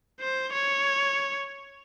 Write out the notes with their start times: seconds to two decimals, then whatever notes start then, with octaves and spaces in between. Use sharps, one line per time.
0.20 C5
0.53 C#5